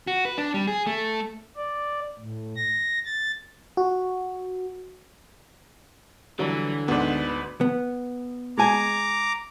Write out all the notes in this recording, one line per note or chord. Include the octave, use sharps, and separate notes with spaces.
F#4
B4
D4
G3
G#4
A3
D5
A2
A#6
A6
F#4
D3 E3 F#3 G3
D2 G#2 B3 D4 B4
B3
G#3 G#5 A#5 D6